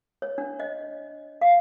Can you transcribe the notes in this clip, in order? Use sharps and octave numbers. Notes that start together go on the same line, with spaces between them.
C#5
D4
D#5
F5